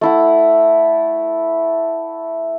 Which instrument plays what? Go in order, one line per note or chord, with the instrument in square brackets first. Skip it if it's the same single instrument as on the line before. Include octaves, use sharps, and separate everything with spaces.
[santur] A3 E4 F#5